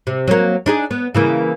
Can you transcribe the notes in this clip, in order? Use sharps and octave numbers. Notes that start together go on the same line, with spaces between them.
C3
F#3 A#3
D4 D#4 G#4
B3
C#3 E3 A#3